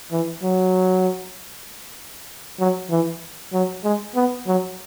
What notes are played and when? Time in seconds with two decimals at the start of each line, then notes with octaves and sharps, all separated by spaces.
0.12 E3
0.43 F#3
2.60 F#3
2.91 E3
3.53 F#3
3.84 G#3
4.15 B3
4.47 F#3